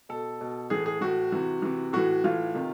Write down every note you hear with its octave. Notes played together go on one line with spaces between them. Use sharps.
B2 A4
B2
A2 E3 G#4
G#4
A2 E3 F#4
C3 E3
C3 E3
A2 E3 F#4
A2 E3 F4
C3 D#3